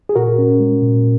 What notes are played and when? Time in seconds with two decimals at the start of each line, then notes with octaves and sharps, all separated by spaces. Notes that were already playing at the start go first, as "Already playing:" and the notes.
0.09 G#4
0.15 A#2 F#4 A#4
0.38 C#4
0.60 G#3
0.83 A#2